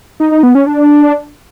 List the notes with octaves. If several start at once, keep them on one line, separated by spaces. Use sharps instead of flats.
D#4
D#4
B3
C#4
D4